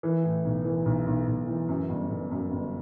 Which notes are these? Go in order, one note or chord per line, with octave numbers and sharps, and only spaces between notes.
E3
A2
B1
E3
B1
B1
B1
E3
F#2
G1
G1
F#2
G1